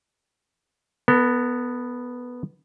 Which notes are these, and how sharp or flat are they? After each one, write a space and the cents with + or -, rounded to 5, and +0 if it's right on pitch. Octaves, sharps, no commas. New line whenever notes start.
B3 +0 A4 +45